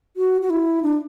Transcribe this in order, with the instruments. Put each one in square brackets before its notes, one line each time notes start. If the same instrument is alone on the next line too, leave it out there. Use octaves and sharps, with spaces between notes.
[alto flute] F#4
F#4
E4
D4